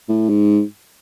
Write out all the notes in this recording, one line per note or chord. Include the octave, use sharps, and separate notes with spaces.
A2
G#2